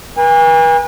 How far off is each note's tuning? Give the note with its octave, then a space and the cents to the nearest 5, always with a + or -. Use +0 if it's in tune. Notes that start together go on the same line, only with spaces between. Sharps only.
B4 -40 G#5 -40